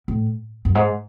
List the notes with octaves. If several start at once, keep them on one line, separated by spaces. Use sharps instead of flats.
A2
F#2
G#2